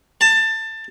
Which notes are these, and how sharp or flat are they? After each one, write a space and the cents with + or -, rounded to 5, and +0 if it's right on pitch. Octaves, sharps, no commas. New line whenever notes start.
A5 +20